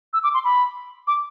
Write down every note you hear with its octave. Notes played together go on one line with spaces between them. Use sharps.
E6
D6
C6
B5
D6